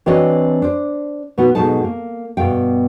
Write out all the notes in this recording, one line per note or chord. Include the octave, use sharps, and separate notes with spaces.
E3 C4 D4 F#4 C#5 D#5
D4 C5
B2 B3 D#4 F#4
G#2 B2 F#3 D#4 A4 A5
A#3
G2 B2 F5 G5